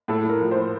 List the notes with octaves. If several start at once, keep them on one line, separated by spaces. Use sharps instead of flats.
A2 A4
A2 A#4
F3
A2 C5